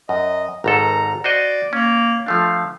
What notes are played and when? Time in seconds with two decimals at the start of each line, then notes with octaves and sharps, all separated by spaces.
0.09 F#2 D#5
0.64 G#1 G#2 A4 A#5
1.24 F#4 C5 D5 D#5
1.73 A#3 C#4
2.26 F3 A3 D4 F5